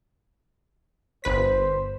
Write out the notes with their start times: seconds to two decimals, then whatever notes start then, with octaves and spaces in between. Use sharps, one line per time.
1.24 G1 B4 C5 B6